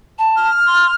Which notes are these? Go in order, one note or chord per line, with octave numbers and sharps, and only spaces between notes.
A5
F6
C6